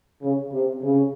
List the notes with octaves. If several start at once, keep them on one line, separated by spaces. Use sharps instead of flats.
C#3
C3
C#3